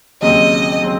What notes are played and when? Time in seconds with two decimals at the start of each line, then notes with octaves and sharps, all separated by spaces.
0.22 D#2 C#3 F#3 C4 D#5
0.82 C#3 F#3 C4